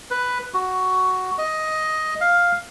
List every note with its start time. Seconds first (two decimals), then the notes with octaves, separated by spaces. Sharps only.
0.11 B4
0.54 F#4
1.38 D#5
2.21 F5